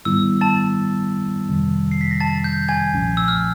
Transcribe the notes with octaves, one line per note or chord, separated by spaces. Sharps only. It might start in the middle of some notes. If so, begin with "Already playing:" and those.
G#2 D#3 G3 B3 E4 E6
A5 A6
F2 C3 D#3 G3
C7
B6
A#6
A5 A6
G6
G#5 G#6
B1 A#2 F3 A3 C#4
E6
F6